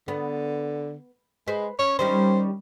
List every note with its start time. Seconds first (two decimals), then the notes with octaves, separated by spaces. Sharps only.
0.08 D3 B3
1.48 G#3 B4 C5
1.79 C#4 C#5
1.99 D#3 G3 C#4 C5